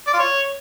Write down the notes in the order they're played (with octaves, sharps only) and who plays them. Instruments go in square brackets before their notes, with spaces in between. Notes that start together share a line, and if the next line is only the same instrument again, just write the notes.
[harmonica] D5
F4
C#5